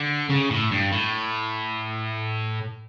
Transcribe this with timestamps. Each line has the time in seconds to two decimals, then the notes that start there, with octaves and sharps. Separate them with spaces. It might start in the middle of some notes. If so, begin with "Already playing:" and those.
Already playing: D3
0.30 C#3
0.50 A2
0.71 G2
0.92 A2